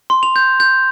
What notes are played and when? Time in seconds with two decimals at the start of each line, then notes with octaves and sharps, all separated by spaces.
0.10 C6
0.23 F7
0.36 G6
0.60 G6